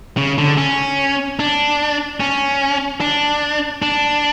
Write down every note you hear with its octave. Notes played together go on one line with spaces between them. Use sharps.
C#3
D3
C#4
D4
C#4
D4
D4